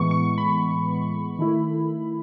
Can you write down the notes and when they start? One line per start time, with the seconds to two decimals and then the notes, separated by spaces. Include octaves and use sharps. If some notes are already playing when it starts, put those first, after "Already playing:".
Already playing: A2 E3 G#3 B3 C#6
0.11 C#6
0.38 B5
1.39 D#3 A3 E4